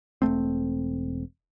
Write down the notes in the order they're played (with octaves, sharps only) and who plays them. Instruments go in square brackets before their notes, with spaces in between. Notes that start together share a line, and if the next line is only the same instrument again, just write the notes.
[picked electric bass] E1 F2 A3 C4